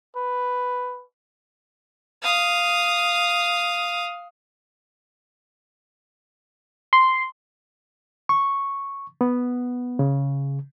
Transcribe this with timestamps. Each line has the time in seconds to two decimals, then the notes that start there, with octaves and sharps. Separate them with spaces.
0.16 B4
2.23 F5 D#6
6.93 C6
8.29 C#6
9.21 B3
9.99 C#3